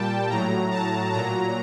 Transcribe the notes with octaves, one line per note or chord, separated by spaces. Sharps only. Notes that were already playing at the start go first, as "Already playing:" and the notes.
Already playing: A#2 G3 G5 A5
A2 F#3 A#5
A5
A#2 F#3 A#5